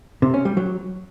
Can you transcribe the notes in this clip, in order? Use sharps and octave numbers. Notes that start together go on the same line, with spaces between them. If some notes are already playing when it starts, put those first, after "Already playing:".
C3
C#4
G3
F#3